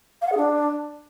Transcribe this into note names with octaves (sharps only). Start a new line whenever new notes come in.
F5
F#5
G#4
D4